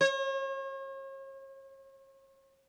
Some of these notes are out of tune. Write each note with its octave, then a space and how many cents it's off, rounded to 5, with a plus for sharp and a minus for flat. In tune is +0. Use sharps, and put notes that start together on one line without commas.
C#5 -40